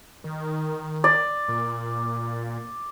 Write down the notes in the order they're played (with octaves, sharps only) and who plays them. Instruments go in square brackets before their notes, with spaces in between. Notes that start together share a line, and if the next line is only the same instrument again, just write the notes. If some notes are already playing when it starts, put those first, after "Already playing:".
[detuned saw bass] D#3
[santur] D5
[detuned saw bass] A#2